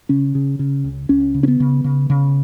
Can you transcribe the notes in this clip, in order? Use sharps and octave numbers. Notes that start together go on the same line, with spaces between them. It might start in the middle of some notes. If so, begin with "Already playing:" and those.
C#3 C#4
C#3
C#3
C#2
C#2 C#4
C#3
C#4
B3
C#3
C#3
C#3